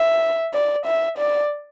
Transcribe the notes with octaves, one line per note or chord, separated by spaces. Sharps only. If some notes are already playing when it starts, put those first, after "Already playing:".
Already playing: E5
D5
E5
D5